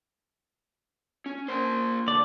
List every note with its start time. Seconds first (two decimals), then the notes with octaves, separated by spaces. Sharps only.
1.26 C#4
1.48 A#3 C5
2.08 D3 D5